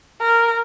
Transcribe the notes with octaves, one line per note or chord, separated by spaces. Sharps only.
A#4